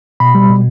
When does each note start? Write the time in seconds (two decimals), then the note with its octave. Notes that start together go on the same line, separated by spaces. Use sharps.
0.20 B2 B5
0.35 G3
0.49 B2